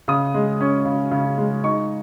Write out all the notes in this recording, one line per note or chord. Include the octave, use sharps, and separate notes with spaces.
C#3 D#6
G#3
C#4
C#3
C#3
G#3
D#4 C#6